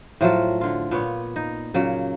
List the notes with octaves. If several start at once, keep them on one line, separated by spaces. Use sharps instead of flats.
A2 F3 F#3 F4
D3 F4
A#2 B3 C#5
D#4
A#2 C#3 F#3